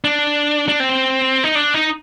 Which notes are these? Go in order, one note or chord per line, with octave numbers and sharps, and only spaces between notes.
D4
D4
C4
D#4
D4
D#4